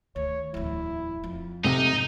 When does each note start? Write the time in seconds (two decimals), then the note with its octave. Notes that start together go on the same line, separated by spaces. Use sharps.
0.16 D2 D#3 C#5
0.54 D1 E2 E4
1.24 F2
1.64 G#2 C3 D#4 A4